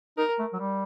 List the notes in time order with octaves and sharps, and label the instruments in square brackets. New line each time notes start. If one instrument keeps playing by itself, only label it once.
[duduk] D#4 [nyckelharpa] A#4
[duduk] A3
F#3
G3